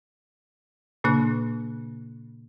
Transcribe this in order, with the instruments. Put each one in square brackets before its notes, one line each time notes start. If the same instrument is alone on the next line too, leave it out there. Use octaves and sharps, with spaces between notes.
[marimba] A#2 C#3 A#3 D4 F#6